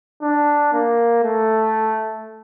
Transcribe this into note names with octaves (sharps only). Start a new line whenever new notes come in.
D4
A#3
A3